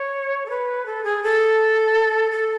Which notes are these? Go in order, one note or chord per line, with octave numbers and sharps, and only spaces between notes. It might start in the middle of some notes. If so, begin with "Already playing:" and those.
Already playing: C#5
A4
B4
A4
G#4
A4
A4